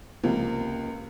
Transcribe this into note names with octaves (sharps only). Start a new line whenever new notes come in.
C#2 C3 F3 A#3